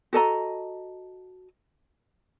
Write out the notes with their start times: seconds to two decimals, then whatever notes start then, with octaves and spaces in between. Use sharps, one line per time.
0.13 F#4 A4 D#5 A#5